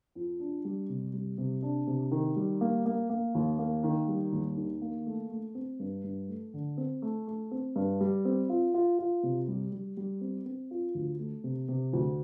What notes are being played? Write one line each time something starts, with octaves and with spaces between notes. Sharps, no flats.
F2
D4
G3
C3
G3
C3
D4
C3
D#3
G3
A#3
A#3
A#3
D#2
A#3
D#3
G3
D#2
D#3
A#3
A3
A3
C4
G2
G2
A3
D3
C4
A3
A3
C4
G2
G3
C4
F4
F4
F4
C3
G3
G3
G3
C4
C4
F4
D2
A3
C3
C3
D2